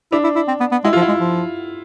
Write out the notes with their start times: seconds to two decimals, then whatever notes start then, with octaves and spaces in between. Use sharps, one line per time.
0.12 D4 E4
0.24 E4
0.36 E4
0.48 C4
0.60 B3
0.72 B3
0.84 G#3 E4
0.93 F3 F4
1.02 E4
1.08 G#3
1.20 F3